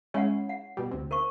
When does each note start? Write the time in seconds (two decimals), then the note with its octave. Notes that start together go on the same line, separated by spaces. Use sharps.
0.14 G#3 C#4 E4 C#5 F#5
0.49 F#5
0.77 B2 G3
0.91 D2 C3
1.11 A#4 C5 C#6